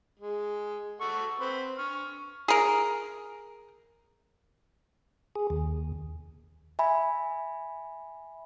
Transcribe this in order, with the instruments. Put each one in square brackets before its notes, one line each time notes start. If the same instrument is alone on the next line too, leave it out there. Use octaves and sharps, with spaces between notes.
[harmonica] G#3
A4 F#5 C#6
C4 B4
C#6 F6
[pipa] G#4 A#4
[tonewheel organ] G#4
D#2
[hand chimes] E5 G#5 B5